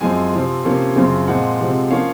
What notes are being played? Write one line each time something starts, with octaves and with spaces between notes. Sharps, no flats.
F#2 F3 G#3 C4 G#5
C3 F3 C4
C3 F3 A#3 C#4
F#2 C#3 F3 C4
A#2 F3 G#3 C4 F#5
C3 F3 G#3 C4
F3 A#3 C#4 F5